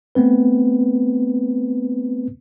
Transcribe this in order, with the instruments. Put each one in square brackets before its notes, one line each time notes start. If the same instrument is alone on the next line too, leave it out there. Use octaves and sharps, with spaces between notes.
[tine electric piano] A3 B3 C4 B4